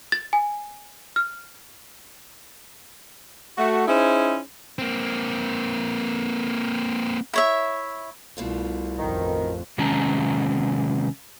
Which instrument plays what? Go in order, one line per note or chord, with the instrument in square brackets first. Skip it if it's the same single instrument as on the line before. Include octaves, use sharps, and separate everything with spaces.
[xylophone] A6
G#5
F6
[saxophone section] A3 F#4
C#4 D#4 E4 G#4 C5
[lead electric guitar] A#3 C4
[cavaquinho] E4 C#5 E5
[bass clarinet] C2 [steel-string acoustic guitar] B2 A3 F4
[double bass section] A1 F2 [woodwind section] D#3
[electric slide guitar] C3 D#3 G#3 C#4 A5 A#5